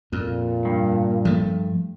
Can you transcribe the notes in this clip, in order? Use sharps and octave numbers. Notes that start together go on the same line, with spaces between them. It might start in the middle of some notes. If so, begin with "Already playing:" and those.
F2 A#2
G2
F3 A3